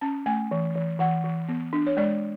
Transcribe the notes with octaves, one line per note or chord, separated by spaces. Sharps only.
C#4 A5
A3 G#5
E3
E3
E3 F#5
E3
B3
D4
C#5
G#3 D5